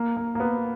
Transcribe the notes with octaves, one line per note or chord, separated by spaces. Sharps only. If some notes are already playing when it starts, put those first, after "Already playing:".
Already playing: A#3
A#3
A#3
B3